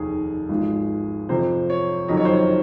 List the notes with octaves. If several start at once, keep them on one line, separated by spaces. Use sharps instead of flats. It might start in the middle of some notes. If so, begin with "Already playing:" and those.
Already playing: F1 D#2 D#3 G#4
G#1 G#2 F3 G#3
F2 C3 F3 C5
C#5
F#1 F2 D#3 F#3 D#5
C#5
C5
C#5